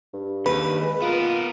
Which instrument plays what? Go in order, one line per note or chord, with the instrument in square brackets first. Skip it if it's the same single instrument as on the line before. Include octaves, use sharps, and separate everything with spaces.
[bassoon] G2
[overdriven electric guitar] D#2 [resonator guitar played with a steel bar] B4 [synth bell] B5
[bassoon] G#3
[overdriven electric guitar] B3 A#4 [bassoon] F4